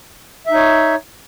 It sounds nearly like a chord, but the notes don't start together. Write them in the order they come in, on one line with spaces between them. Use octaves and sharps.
E5 D#4 C#5